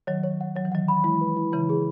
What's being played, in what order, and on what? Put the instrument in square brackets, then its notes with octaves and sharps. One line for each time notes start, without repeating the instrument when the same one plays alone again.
[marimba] D#3 F#3 [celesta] C#5
[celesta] C#5
F#5
[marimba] F#3 [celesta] C#5
[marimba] E3
[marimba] D#3 F#3 [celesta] F#5
[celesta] B5
[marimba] E3 G#3 [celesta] E4
[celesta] B4
E4
[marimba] C#3 E3 [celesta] E4
[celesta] G#4